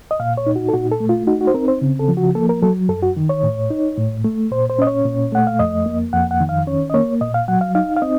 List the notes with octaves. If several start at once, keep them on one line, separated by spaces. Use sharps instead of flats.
D#5
A#2 F5
C#5
D#4
F#4
A4
A#2 F#4
A4
A3
F4
D#4 F#4
F#4
C5
C4 A#4
C5
C#3
A4
F3
F#4
A#3 A4
A#4
F#3 A4
F#2 A4
F#4
D#3
C#5
A2
D#4
A2
A3
A#2 C5
C5
C#4 D#5
C#5
A#2
A3 F#5
F5
F2 D#5
A#3
F2 F#5
F#5
D#3
F5
C#4 C#5
D#5
A#3 C#5
A#2 D#5
F5
F#3 F#5
F5
D#4 F5
F5
C4 D#5